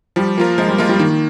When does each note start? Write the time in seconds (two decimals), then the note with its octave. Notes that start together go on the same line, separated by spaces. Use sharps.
0.16 F3 G3
0.37 F3 A#3 F4 A#4
0.58 F3 G#3
0.68 G3
0.78 G#3 A#3 F4 A#4
0.89 G3
0.99 D#3 A#3